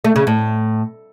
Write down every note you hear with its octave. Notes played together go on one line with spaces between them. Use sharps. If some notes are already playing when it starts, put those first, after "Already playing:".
A3
C#3
A2